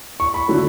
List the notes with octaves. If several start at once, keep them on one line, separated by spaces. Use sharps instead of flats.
C#6
B5
D3 F#3 A3